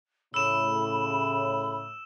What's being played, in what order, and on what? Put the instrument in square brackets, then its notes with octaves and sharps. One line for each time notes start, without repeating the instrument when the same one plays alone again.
[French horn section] A2 C#3 [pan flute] B5 [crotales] E6 E7